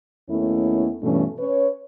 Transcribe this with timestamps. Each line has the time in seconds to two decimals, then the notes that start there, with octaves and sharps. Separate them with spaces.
0.29 D#2 A3 B3 C#4 E4
1.02 G2 B2 E3 A3 C#4
1.39 C#4 B4 C#5